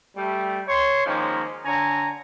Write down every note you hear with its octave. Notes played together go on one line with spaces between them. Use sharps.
G3 A3
C#5 C6
D#3 F3 G#3 A#3 C#4
D3 C#5 G#5 A#5